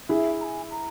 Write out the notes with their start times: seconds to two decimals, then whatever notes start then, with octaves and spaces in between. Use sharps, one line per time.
0.09 E4 G#4 E5
0.41 A#5
0.44 G#5
0.71 A#5